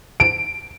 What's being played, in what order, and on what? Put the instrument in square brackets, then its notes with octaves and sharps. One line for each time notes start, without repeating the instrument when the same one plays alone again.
[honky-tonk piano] D7